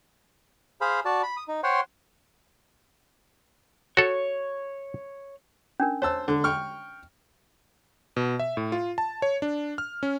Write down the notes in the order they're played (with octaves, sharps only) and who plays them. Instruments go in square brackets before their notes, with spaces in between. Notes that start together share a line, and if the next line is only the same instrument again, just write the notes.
[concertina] G#4 C5 F5 B5
F#4 D5 A5
B5
D#6
D#4
C5 C#5 F#5 G5 C6
[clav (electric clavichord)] F#4 A4 [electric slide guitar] C#5
[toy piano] C#4 D4 A#4
[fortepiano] C5 A5 E6 [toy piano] C#5
[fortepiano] D3
G5 C#6 F6
[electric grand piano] B2
E5
A2
F4
A5
C#5
D4
F6
C#4